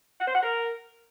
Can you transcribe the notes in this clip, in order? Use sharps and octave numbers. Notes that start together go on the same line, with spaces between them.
F#5
C5
F#5
A#4